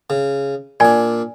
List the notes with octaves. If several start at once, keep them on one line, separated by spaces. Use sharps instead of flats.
C#3
A#2 D4 D5 G#5